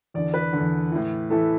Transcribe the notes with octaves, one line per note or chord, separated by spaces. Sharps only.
E2 D3 D5
B4
D3
E2
A2 E3
A2 E3 A4